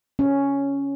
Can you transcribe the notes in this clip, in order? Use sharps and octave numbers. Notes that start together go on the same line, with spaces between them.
C#4